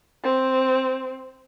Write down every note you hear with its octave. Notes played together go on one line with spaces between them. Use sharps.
C4